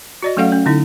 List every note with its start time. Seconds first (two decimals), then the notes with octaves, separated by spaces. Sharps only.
0.23 F#4 D5 D#5
0.37 F#3 A3 C#4 A4 F5 F#5
0.52 C#4
0.66 D3 D#4 E4